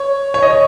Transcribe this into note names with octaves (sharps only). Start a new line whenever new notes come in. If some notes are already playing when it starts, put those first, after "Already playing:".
Already playing: C#5
C#5
D#5
C#5